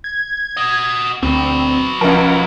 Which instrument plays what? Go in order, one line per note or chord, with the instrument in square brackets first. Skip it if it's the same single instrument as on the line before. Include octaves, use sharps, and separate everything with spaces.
[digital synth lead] G#6
[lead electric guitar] F#4 D#5
[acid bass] D2 [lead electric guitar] F#3 B4 [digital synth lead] C4
[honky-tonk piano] C#2 A#4 [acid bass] F3 [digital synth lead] F#5